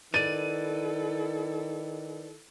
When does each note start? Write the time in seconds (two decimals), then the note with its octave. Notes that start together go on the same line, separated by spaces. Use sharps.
0.14 D#3 E4 A4 B4 D5 A6 D#7